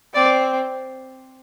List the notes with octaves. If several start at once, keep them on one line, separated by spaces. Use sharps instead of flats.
C4 D5